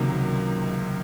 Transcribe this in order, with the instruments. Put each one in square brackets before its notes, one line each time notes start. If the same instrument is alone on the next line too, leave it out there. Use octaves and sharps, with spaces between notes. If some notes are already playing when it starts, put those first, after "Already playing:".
Already playing: [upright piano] C#2 C3 D#3 F#3 A#3